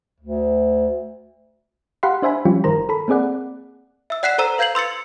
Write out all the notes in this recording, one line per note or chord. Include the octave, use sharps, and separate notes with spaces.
D2
G4 F5 F#5 B5 C6
D4 C5 E5 G#5 B5
F3 G3 C#4 F4 G4
G1 D#3 A#4 C5 A#5
A4 B5
A#3 C4 G#4 D5 F#5
E5 E6
D5 F#5 F#6 B6 C7 E7
A4 C5 A#5 E6 E7
B4 F5 G6 G#6 C7 F#7
C6 E6 A6 C#7